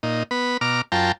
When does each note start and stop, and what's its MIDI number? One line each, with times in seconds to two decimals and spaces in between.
0.03 0.23 46
0.03 0.23 63
0.31 0.57 59
0.31 0.57 83
0.61 0.81 47
0.61 0.81 82
0.61 0.81 86
0.61 0.81 89
0.92 1.12 42
0.92 1.12 65
0.92 1.12 79
0.92 1.12 81
0.92 1.12 82